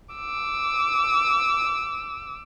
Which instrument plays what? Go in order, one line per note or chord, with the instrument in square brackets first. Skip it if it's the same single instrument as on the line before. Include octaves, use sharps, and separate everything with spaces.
[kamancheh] D6 E6